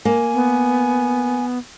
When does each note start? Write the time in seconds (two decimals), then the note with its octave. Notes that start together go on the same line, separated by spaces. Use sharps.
0.05 A#3 G#5
0.34 B3